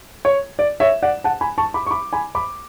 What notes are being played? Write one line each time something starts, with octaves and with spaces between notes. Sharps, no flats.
C#5
D5
C#5 E5
D5 F#5
F#5 A5
G#5 B5
A5 C#6
B5 D6
C#6
B5 D6
G#5 B5
B5 D6